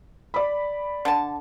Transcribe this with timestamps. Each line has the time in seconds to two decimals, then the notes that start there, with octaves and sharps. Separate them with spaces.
0.34 D5 B5
1.05 D3 A5